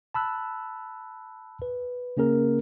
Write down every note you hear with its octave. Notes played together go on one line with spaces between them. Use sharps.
A5 B5 E6 F#6
B4
C#3 A#3 C#4 G#4 A#4